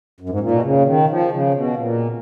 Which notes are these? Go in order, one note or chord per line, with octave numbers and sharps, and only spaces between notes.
F#2
G#2
A#2
B2
C#3
D#3
F3
C#3
B2
A#2